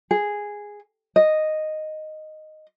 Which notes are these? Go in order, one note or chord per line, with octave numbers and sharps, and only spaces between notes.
G#4
D#5